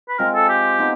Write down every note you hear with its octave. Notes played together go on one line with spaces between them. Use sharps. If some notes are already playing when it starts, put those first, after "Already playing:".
B4
G#3 C4 F4 A#4
A4
G4
B3 D#4